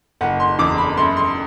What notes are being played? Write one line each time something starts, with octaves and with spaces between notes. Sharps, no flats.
F#1 F#5
C6
E2 D6
B5
F#2 C6
C6